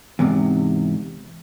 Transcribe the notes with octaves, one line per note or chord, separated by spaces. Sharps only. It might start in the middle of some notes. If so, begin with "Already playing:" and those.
E2 G#2 C3